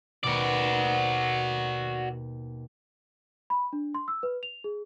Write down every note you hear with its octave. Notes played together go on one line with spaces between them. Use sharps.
D#2 B2 F#4 D5
B5
D4
C6
E6
B4
F7
G#4